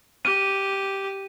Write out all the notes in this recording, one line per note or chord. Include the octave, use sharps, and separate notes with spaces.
G4 D#7